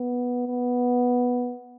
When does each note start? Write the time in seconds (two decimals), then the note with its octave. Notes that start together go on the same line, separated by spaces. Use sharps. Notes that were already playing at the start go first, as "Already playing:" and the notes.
Already playing: B3
0.47 B3